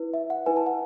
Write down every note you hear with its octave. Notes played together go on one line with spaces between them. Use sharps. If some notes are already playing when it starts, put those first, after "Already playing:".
Already playing: E4 B4
E5
F#5
E4 B4 G#5
A5
F#5